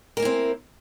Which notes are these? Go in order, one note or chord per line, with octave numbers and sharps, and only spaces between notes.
A#3 C4 E4 A#4